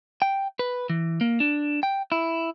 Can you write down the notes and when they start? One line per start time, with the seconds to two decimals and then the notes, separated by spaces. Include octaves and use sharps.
0.22 G5
0.59 B4
0.90 E3
1.21 A#3
1.40 D4
1.83 G5
2.12 E4